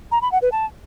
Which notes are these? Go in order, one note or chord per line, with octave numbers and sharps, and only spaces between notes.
A#5
B5
F#5
B4
A5